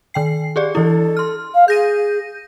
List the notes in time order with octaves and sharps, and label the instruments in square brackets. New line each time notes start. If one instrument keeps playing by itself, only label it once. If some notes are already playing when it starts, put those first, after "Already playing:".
[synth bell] D#3 G5 C7
G4 G#4 D5
[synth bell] E3 E4 [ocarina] A4
[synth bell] C6 F6
[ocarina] F5
[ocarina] G#4 [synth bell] G6 A#6 D#7